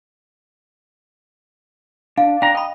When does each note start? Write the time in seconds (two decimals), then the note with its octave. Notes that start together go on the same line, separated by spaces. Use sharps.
2.17 D4 F5
2.42 D4 G5 A#5
2.55 D#5 G5 B5